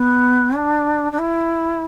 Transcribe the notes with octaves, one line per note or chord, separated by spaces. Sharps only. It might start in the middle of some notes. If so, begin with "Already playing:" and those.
Already playing: B3
D4
D4
E4